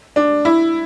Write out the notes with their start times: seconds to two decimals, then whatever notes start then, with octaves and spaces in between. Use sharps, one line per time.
0.16 D4
0.45 E4